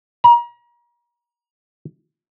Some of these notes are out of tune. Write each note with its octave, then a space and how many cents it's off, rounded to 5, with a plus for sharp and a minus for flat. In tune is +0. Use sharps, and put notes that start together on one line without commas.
A#5 +35